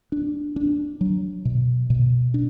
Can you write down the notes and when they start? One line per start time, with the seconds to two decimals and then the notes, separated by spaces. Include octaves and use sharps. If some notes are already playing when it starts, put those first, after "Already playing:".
0.12 D4
0.56 D4
1.01 F#3
1.45 B2
1.90 B2
2.34 D4